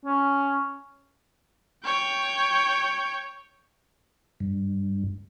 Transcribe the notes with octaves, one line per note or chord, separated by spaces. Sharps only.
C#4
C#5 G5
G2